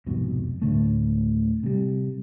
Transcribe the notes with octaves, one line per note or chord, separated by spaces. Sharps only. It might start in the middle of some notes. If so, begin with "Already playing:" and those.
C2 F2 G#2 B2
D2 A2 D3 A3
C3 G3